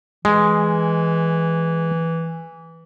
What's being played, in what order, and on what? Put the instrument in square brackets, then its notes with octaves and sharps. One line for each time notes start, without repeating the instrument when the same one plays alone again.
[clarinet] E3 [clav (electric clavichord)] G#3